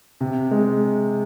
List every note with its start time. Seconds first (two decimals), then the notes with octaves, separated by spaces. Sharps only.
0.21 C3
0.51 G#3